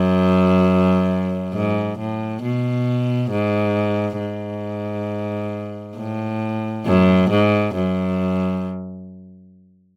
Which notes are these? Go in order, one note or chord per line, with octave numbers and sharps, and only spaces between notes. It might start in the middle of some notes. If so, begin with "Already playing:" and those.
Already playing: F#2
G#2
A2
B2
G#2
G#2
A2
F#2
G#2
F#2